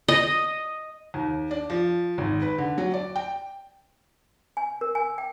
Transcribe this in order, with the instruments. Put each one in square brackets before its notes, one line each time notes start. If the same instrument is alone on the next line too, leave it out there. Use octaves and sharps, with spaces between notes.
[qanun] D#5
[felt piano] D#2
D4
F3
G#1
B4
D3
F#3
D5
G5
[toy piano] G#5
A#4
G#5
G5